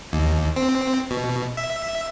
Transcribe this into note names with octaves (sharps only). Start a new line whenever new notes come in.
D#2
C4
B2
E5